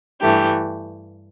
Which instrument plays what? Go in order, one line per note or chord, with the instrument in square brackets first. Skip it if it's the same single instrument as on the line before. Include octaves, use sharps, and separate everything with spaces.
[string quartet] G2 E3 A3 G4